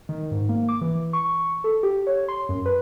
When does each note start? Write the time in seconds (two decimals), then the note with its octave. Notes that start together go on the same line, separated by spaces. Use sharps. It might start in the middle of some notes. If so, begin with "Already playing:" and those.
0.09 D#3
0.31 G#2
0.49 A#3
0.69 D6
0.81 E3
1.13 C#6
1.64 A4
1.83 G4
2.07 C#5
2.28 C6
2.49 F#2
2.66 B4